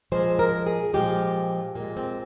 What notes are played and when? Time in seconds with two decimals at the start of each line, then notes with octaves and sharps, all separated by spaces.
0.12 A#2 F3 G#3 C5
0.39 A#4
0.66 G#4
0.94 A#2 F3 G#3 G4
1.75 A#2 G#3
1.97 C4